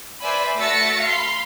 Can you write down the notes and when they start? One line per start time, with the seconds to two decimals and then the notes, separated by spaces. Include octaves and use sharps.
0.21 B4 C5 D5 E5 G#5 B5
0.56 A3 F#4 E5 A6 A#6 C#7
1.02 F5 B5 C6